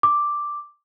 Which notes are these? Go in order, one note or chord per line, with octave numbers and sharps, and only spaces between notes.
D6